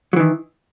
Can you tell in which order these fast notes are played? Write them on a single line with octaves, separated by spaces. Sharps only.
F#3 E3 D#3